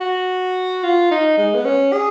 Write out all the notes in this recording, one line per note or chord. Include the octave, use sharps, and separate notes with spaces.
F#4
F4
D#4
G#3
B3
C#4
G#4